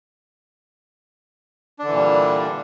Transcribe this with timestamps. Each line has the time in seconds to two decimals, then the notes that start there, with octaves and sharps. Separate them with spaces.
1.79 D4
1.83 D3
1.88 E3
1.92 A#2
1.96 G3